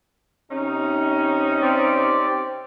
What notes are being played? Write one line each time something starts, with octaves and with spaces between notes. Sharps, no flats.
C3 C#4 D#4
C4 G4 D5